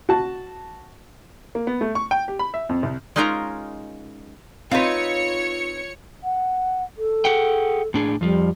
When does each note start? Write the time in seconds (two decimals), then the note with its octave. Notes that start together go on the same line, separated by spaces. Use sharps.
0.09 F#4 A5
1.55 A#3
1.67 B3
1.81 A3
1.95 C#6
2.11 G5
2.28 G4
2.39 B5
2.54 E5
2.69 F2
2.83 C2
3.16 G#3 C#4 D#4 F4 A#4 A#5
4.71 C4 D#4 F4 B4 C#5 C#7
6.24 F#5
6.98 A4
7.25 G#4 F#5 G5
7.94 A2 D4 G#4
8.21 F2 F3 G3